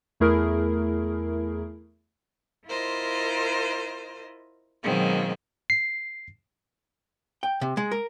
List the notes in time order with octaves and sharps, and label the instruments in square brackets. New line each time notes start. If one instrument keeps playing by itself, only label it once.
[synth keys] E2 A3 E4 G#4 A#4
[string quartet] E4 F4 A#4 C5 D#5
B2 D#3 F#3 G#3 A#3 C4
[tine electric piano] C7
[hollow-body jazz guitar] G5
C3
G#3
A#4